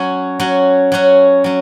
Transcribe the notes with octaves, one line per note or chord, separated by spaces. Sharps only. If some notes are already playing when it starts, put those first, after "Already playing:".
Already playing: F#3 C#4 F#4
F#3 C#4 F#4
F#3 C#4 F#4
F#3 C#4